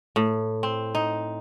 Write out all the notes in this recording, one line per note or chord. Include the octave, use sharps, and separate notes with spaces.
A2
C4
D#4